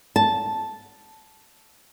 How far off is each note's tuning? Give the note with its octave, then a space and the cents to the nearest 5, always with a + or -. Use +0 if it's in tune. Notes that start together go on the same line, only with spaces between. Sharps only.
A5 -5